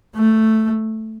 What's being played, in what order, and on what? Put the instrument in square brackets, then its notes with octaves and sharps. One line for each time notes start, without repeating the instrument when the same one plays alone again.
[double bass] A3